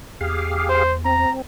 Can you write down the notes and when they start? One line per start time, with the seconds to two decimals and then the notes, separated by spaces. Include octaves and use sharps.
0.21 E2 G4 G#4 F5
0.69 C5
1.05 C4 A#5